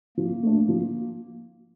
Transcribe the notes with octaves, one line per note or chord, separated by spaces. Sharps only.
F3 A#3
A3 D4
F3